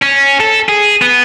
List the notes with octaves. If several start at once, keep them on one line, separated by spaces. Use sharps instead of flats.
C#4
A4
G#4
B3